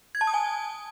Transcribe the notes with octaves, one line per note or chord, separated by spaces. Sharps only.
G#6
A5
D#6
G#5